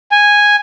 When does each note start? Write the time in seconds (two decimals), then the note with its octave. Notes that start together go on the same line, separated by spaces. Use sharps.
0.12 G#5